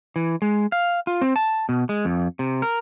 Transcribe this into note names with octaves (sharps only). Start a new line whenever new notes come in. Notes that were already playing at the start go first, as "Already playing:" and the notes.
E3
G#3
F5
F4
C4
A5
B2
G#3
F2
C3
A#4